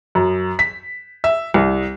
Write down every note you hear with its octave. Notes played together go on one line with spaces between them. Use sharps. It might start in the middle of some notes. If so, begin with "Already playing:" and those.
F#2
B6
E5
C2